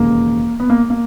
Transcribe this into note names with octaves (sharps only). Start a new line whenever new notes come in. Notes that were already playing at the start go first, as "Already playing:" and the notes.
Already playing: E1 D#2 C#3 A#3
B3
A#3
A#3